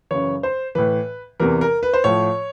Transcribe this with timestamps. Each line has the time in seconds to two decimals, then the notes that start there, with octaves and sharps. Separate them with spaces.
0.11 F#2 C#3 E3 C#5
0.43 C5
0.75 A2 E3 B4
1.40 E2 C3 E3 A#4
1.61 A#4
1.83 B4
1.93 C5
2.04 A2 F3 C#5